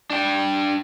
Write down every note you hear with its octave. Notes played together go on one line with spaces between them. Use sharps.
D4 G5